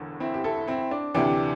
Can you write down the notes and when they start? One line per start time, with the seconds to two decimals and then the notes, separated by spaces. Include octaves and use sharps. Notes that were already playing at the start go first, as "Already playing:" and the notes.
Already playing: E1 E2 D3
0.20 C4 E4
0.34 G4
0.44 E4 A4
0.67 C4 E4
0.91 D4
1.14 D2 C3 E3 D4 G4